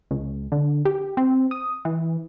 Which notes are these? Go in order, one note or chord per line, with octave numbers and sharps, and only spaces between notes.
C#2
D3
G4
C4
D#6
E3